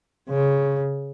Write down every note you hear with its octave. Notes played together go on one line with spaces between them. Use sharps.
C#3